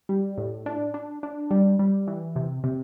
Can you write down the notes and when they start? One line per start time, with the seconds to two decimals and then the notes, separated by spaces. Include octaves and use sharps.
0.09 G3
0.38 A2
0.66 D4
0.94 D4
1.23 D4
1.51 G3
1.79 G3
2.08 E3
2.36 C3
2.64 C3